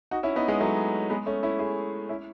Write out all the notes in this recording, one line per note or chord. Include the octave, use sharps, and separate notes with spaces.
D#4 F#4
C#4 E4
B3 D#4
G#3 B3
F#3 A3
G#3 B3
A3 C#4
C#4 E4
E4 G#4
C#4 E4